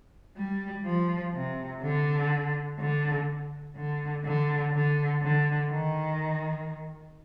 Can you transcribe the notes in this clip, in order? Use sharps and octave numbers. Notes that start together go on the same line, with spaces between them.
G3
F3
C3
D3
D3
D3
D3
D3
D3
D#3